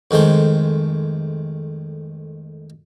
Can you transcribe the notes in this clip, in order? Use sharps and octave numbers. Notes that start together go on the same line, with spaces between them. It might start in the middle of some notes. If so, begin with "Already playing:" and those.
F2 D#3 G#3 A3 C5